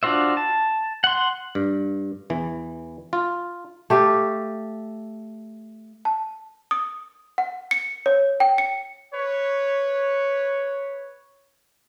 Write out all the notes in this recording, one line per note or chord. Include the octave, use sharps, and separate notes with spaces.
D4 F4 F#4 C5 E5
A5
F#5 C6
G2
E2 E3
F4
A3 G4 E5 F5
A5
D#6
F#5
C#7
C#5
G5
C#7
B4 C#5